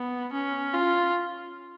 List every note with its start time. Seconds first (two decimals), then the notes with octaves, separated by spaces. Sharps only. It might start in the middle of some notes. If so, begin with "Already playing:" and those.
Already playing: B3
0.33 C#4
0.74 F4